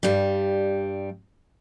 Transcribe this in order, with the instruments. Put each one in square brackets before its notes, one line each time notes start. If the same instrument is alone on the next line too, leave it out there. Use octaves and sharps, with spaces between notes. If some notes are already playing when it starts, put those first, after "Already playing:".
[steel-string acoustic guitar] G2 G3